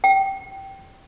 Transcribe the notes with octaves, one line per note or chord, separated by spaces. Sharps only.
G5